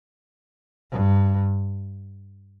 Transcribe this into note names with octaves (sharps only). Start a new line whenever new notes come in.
G2